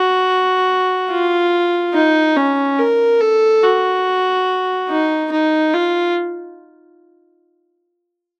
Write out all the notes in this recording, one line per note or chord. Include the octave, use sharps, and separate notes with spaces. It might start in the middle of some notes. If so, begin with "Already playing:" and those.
Already playing: F#4
F4
D#4
C#4
A#4
A4
F#4
D#4
D#4
F4